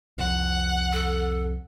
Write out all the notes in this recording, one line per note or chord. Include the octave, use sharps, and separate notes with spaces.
C2 F2 F#5
A4